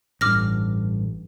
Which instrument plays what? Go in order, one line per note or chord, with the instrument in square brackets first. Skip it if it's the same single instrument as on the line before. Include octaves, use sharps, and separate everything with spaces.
[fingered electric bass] A1 G2 [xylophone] D6 F6 A#6